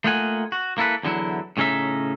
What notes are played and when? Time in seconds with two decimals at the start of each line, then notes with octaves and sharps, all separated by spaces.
0.04 A3 A#3 D#4 F4 F#5 G#5
0.52 F#4
0.78 A#3 E4 A4 B4
1.03 E2 D3 E3 F#3 E4
1.57 A2 C#3 C#4 D#4 E5